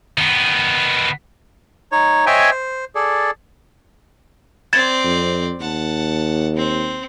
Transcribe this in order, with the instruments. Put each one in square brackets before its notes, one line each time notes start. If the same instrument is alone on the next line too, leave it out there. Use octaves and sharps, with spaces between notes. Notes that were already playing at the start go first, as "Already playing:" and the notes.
[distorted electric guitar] D#3 B3
[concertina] D#4 C#5
C5 C#5 D#5 E5 G5 G#5
C5
G#4 A4 D5
[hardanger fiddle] C4 D5 [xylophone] G#6 A6 E7
[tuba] F2
[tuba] D#2 [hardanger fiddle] F#5 A5
[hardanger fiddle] C4